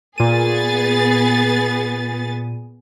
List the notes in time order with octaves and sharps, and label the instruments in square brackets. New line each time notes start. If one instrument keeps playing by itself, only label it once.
[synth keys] A#2 D#7 [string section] B3 G#4 A6